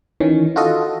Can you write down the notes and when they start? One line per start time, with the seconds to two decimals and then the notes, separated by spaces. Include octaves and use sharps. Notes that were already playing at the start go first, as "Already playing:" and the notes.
0.20 D#3 E3 C#4
0.56 F4 F#4 A4 D#5